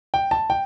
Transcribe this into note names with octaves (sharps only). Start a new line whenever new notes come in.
G5
A5
G5